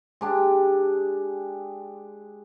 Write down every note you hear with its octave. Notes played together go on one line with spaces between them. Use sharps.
G#3 D4 G4